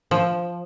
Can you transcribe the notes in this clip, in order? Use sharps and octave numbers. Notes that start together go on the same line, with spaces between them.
F3